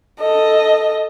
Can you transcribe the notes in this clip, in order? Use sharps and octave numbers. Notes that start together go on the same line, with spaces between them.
A4 D#5